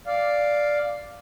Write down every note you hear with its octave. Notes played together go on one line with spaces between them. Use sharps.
D5 F5